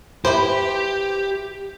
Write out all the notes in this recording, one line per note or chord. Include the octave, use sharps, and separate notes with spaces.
E4 G4 B4 C5